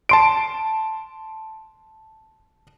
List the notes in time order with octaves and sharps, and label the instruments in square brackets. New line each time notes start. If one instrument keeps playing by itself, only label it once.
[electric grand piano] A5 C6 D7